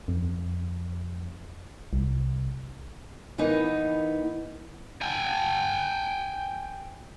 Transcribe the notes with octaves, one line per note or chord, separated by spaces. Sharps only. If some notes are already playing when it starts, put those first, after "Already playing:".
F2
C2
E3 A#3 B3 D#4
G5 G#5